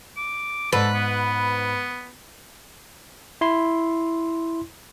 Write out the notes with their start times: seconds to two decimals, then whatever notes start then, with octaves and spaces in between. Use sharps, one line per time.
0.17 D6
0.73 G#2 A4 B4
0.94 B3
3.41 E4 C6